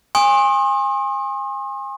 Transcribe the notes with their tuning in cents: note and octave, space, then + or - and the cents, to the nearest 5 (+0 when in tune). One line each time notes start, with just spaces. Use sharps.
G#5 -30 C6 +40 D#6 -10